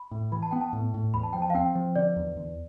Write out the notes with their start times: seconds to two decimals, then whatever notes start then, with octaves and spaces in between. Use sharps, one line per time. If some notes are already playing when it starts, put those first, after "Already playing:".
Already playing: B5
0.11 A2
0.32 E3 B5
0.43 A5
0.51 B3 G5
0.61 A5
0.73 A2
0.94 A2
1.14 E2 B5
1.23 A5
1.33 F3 G5
1.42 A5
1.50 F5
1.55 C4 G5
1.75 F3
1.96 D3 D5
2.16 E2
2.37 E2